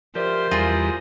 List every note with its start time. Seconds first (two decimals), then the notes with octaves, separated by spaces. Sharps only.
0.15 F3 G4 A#4 C5 D5 E5
0.51 E2 G3 F4 G#4 A#5